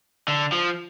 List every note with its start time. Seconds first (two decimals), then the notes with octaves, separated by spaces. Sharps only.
0.28 D3
0.52 F3